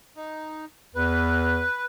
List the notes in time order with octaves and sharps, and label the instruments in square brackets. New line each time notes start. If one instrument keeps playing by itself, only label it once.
[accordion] D#4
[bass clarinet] E2 [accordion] B4